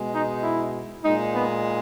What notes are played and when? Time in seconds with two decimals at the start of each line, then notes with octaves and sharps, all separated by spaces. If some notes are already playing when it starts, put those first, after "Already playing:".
Already playing: B2 G#3
0.13 D#4
0.43 E4
1.04 A#2 G#3 D#4
1.35 B3